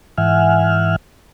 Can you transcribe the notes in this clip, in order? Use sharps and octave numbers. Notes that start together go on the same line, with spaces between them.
G#2 E3 E5 F#5 G#5 F6